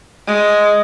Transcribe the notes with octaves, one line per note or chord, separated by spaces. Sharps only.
G#3